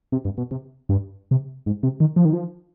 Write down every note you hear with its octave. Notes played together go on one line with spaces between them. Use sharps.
C3
G2
B2
C3
G2
C3
G#2
C3
D#3
F3
D#3
F3